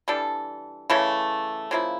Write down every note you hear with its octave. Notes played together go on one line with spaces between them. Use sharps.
E3 G3 D4 A4
C#3 E3 A3
C#3 F3 A#3 E4